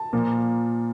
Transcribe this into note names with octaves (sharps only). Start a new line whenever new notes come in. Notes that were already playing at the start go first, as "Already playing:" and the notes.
Already playing: A5
A#2 F3 A#3